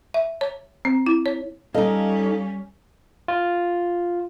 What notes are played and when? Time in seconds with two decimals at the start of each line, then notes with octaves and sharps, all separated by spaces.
0.14 E5
0.41 C#5
0.85 C4
1.06 E4
1.26 C#5
1.74 G3 C#4 D#4 A4 D#5 F5
3.28 F4